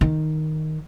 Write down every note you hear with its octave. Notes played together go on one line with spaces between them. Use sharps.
D#3